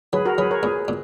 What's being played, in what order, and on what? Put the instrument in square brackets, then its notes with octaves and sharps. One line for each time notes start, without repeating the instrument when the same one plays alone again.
[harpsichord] F#3 [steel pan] G#4 B4
[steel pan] F#4 A#4
[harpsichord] F#3 [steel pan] G#4 B4
[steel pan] A#4 C#5
[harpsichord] A#2 [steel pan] G#4 B4
[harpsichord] A#2